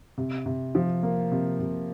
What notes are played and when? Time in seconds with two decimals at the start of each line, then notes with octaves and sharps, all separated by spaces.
0.18 C3
0.46 C3
0.75 F3
1.03 A#3
1.32 C3
1.60 C3